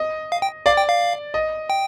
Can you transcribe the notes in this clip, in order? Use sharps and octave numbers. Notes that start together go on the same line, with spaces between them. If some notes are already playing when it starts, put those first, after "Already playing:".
Already playing: D#5
F5
G5
D5 F5
G5
F5
D#5
G5